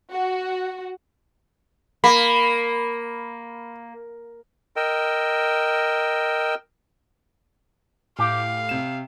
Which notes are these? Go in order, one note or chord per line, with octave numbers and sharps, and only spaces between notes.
F#4
A#3 B5
A#4 D#5 G5 E6
A2 G4 F5
C3 E7